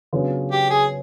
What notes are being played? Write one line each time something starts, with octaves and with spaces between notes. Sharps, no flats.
C#3 F#3 B3 D4 F4
G4
G#4